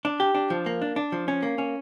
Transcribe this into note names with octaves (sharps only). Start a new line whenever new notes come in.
D4
G4
D4
F3
A#3
D4
D4
F3
C#4
A#3
C#4